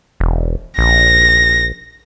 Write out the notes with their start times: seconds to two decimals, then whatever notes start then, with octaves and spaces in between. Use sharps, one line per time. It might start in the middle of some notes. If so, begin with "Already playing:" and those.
0.20 E1
0.78 A#1 A#6